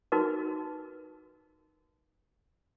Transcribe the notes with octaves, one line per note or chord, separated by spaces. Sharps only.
D#4 F#4 A#4 B4